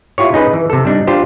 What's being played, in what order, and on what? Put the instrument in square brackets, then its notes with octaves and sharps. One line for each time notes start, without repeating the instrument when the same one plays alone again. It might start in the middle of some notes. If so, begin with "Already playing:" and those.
[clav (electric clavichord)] E4 F4 G4 C#5
C#4 D#4 G#4 B4
E3
C3 A4
G3 D4 D#4
D4 F4 G4 C5